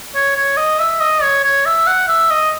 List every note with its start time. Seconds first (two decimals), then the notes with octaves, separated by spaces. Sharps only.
0.15 C#5
0.36 C#5
0.57 D#5
0.79 E5
1.00 D#5
1.23 C#5
1.44 C#5
1.66 E5
1.87 F#5
2.08 E5
2.30 D#5